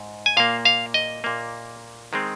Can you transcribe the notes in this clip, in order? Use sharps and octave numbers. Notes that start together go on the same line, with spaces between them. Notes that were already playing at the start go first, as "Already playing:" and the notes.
Already playing: G#2
G#5
A#2 A#3 F5
F5
D#5
A#2 A#3
D#3 G#3 C4